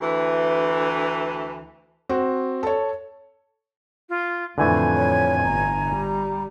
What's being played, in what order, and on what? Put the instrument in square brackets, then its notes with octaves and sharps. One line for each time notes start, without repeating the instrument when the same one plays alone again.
[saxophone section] D2 E3
[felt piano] C4 F#4
A4 C#5
[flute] F4
[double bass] F2 A2 [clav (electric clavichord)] D3 E3 A3 [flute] G#5
[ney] C#5
[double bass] G1 [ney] A#5
[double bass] G3